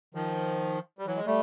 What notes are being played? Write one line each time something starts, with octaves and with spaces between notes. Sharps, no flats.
D#3 F3
G3
E3 F#3
G#3
G3 A3